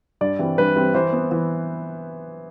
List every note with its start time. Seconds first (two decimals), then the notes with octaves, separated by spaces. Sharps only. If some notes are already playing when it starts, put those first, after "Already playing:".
0.21 G2 D5
0.39 E3 G3 C4
0.58 G2 B4
0.76 E3 G3 C4
0.94 E3 C5
1.13 B3 E4
1.32 E3